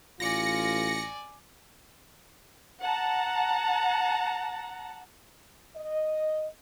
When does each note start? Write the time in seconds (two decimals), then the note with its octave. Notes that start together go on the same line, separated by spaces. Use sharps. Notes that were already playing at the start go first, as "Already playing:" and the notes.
0.20 A1 F4 D5 G#5 A#6 C#7
2.81 F#5 A5 A#5
5.76 D#5